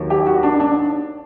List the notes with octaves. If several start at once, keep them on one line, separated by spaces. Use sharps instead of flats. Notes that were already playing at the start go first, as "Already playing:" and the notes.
Already playing: D#2 D#3 F#3
G4
F#4
D4
D4